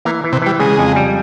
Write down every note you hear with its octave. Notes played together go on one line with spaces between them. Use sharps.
E3 A#3
E3
C3
E3 G3
C#3 G#3
F2
G3